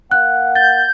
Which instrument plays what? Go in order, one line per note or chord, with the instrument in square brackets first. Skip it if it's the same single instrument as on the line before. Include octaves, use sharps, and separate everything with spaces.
[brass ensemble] A#3 F5 F#5 [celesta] F#6
[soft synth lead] G6 [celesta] A6